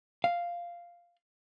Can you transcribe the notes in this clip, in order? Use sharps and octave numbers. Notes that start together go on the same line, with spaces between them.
F5